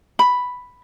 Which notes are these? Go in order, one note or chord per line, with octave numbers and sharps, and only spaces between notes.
B5